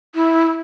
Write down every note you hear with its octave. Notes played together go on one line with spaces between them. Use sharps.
E4